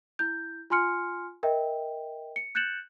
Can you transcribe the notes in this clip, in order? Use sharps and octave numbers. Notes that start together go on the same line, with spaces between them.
E4 G6
F4 G#5 C6 F6 C#7
A#4 D#5 E5 G5
C#7
F#6 G6 A6 C#7 E7 F#7